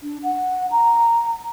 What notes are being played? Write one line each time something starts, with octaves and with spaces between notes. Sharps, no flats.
D4
F#5
A#5